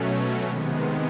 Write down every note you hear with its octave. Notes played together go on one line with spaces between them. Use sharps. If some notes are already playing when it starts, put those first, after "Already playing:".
Already playing: B2 F#3 A3 C#4
C3 D#3 G#3 B3